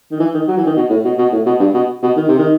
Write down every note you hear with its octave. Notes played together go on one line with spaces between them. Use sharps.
D#3
E3
D#3
F#3
E3
D#3
B2
A2
B2
B2
A2
B2
G2
B2
B2
D#3
C3
D#3